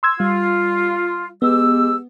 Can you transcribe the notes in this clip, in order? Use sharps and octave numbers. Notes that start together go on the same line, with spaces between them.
C6 E6 G#6
G3 F4
G#3 B3 G4 E6